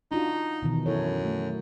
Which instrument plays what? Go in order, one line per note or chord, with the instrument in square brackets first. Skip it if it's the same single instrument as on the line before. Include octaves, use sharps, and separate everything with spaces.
[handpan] D4 F4 F#4 [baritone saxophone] D#4
[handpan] B2 D#3 E3
[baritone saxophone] F#2 [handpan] E4 A4 C#5
[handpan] F#3 A3